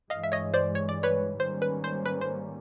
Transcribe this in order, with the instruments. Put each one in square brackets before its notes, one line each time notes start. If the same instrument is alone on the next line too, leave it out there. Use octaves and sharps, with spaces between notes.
[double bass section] G2 E3 G#3 [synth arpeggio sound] D#5 F5
[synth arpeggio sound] E5
C#5 D#5
C5 D5
C#5
D5
B4 C#5
[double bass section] G#2 D#3 G3 A#3 C#4 [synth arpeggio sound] C5
[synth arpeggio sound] B4
C5
B4
C5